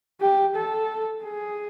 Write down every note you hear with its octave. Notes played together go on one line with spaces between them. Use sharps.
G4
A4
G#4